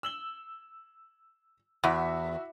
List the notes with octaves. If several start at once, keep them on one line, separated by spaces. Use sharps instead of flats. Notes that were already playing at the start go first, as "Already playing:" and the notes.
E6 F#7 G7
E2 F#4 E5